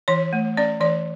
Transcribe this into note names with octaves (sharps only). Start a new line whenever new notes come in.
E3 C#5
A3
C#4 D5
E3 D5